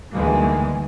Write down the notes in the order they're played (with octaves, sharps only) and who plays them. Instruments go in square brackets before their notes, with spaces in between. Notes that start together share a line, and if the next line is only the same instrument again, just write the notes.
[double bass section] D2 D#3 E3 G3 G#3 A#3